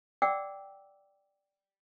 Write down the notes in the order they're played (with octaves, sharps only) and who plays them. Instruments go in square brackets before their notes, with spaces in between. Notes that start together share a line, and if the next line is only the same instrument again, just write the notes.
[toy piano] D5 F#5 G5 D6 E6